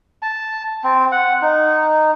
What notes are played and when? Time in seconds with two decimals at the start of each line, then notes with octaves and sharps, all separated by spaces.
0.22 A5
0.84 C4
1.12 F#5
1.42 D#4